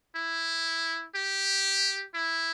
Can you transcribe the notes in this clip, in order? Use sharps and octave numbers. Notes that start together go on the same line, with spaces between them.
E4
G4
E4